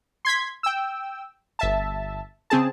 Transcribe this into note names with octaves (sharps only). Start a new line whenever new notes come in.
C6 G#6 B6
G5 E6
G1 E5 A5
C#3 C4 G#4 A5